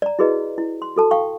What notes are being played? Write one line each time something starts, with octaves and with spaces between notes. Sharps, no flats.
D5 A#5
E4 F#4 G#4 B4 D#5
E4
C6
F#4 A4 A5
F5 G5 C#6